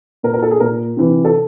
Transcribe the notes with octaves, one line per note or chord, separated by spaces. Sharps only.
A#2 A#4
A#4
A4
G#4
A#2 A#4
C3 E3
A4